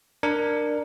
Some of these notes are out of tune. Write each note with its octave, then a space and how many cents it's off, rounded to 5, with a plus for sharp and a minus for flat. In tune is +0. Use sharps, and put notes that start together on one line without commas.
D4 +15 A#4 +0